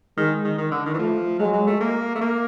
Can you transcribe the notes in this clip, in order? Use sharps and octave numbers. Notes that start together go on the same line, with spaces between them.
D#3 G#3
D#3
D#3
D3
D#3
E3
F3 A3
F#3 G#3
F#3
A3
A#3
A3
A#3